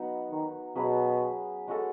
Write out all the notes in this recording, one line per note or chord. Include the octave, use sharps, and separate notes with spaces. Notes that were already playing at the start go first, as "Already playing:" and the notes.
Already playing: F#3 B3 D#4 F#4
D#3
B2 F#3 C#4 G#4 B4
G#3 C#4 F#4 A4